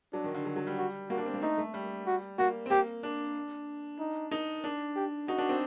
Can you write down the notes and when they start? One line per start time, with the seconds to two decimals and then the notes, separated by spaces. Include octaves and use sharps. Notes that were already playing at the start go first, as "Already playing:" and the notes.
0.13 F#3 D4
0.24 D#3
0.35 D3
0.45 F#3
0.56 F#3
0.67 G3
0.78 F#4
1.10 A#3 F#4
1.18 D4
1.26 C4
1.34 A#3
1.41 A3 D#4
1.58 A3
1.74 G3
2.07 F#4
2.39 A#3 F#4
2.66 C4
2.70 A#3 G4
3.03 D4
3.99 D#4
4.31 D#4
4.64 D4
4.96 G4
5.28 D#4 F#4
5.38 D4
5.49 C4